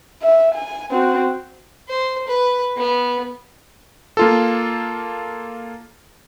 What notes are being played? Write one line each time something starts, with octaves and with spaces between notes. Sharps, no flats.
E5
G#5
C4 F#4
C5
B4
B3
A#3 F4 A4